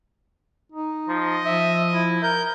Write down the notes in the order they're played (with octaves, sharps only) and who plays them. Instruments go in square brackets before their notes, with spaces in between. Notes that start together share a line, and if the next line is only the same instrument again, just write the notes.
[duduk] D#4
[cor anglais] F3 [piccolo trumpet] D#5
[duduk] F3 [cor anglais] E5
[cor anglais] E4
[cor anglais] A#4 [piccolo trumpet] G6